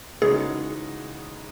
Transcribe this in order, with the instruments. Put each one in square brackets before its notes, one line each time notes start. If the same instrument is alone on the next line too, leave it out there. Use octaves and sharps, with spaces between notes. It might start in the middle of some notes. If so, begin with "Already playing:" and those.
[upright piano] C#3 E3 G#3 D#4 F#4 [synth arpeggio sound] G#4